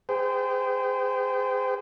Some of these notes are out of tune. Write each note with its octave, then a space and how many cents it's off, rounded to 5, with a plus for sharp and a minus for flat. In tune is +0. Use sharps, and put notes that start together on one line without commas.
G#4 -25 C5 -35 G5 -5